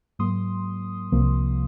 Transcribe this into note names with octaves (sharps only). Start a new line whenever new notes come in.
G#2 F#3 A#3 C6 D#6
C2 C3 F3 A#3